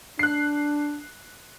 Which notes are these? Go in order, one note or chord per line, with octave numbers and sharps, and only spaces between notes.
D4 F#6 C7